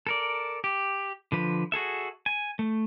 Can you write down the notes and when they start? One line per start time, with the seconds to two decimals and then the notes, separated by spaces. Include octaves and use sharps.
0.07 A4 A#4 D5
0.64 G4
1.32 D3 F3 B4
1.72 F#4 G#4 A4 E5
2.26 G#5
2.59 A3